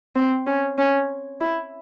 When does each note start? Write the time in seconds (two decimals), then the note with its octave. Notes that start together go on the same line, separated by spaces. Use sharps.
0.16 C4
0.47 C#4
0.78 C#4
1.41 E4